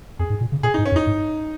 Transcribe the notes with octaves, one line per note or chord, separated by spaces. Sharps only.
F2 G#4
G#2
A#2
C#3
A#2 G#4
D#4
G#2
C#4
F2
D#4
G#2